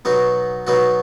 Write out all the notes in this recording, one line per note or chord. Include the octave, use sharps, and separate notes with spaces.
B2 F#3 B3 D#4 F#4
B2 F#3 B3 D#4 F#4